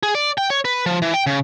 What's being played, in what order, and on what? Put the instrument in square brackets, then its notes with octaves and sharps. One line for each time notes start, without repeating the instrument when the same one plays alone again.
[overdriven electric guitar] G#4
D5
G5
C#5
B4
F3
E3
G5
C#3